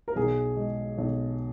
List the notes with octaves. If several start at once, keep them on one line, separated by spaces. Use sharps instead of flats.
A#4
B1 G#4
G#3
B1